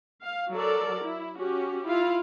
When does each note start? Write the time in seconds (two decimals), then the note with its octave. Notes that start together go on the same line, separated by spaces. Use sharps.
0.21 F5
0.53 F#3 A4 A#4 D5
1.04 E4
1.36 C#4 F#4 G4
1.86 E4 F4 F5